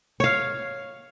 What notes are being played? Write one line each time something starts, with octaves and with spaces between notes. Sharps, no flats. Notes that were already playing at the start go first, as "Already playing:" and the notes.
C#5 F5